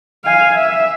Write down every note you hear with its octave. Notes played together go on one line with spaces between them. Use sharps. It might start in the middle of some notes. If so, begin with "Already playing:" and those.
F5 G#5
E5